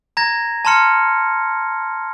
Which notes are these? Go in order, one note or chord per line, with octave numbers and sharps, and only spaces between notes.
A#5 G#6 A#6
A5 A#5 C6 F6 C#7